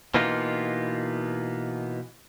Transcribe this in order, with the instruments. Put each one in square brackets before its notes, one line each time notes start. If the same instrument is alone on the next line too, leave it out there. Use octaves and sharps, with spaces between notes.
[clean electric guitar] B2 E3 A#3 B3 D#4 F4